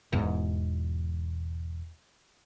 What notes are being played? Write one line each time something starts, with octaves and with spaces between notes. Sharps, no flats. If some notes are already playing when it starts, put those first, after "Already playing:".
E1 E2 G#2